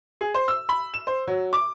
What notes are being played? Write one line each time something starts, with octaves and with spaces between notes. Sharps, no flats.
G#4
C5
E6
B5
E7
C5
F#3
D6